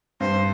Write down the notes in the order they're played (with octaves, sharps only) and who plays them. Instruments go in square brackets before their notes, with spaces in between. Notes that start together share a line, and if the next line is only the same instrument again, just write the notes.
[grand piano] G2 [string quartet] C5